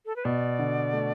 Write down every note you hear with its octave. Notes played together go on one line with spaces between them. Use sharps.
A4
B4
B2 D5
D3
A3